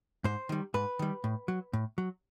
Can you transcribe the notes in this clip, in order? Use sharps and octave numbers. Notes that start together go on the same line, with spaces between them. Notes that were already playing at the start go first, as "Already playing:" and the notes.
G#2 C5
D#3 G3
G#2 B4
D#3 G3
A2
F#3
A2
F#3